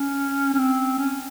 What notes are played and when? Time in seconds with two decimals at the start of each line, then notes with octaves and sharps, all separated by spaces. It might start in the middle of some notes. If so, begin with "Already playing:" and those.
Already playing: C#4
0.54 C#4
0.59 C4
0.98 C#4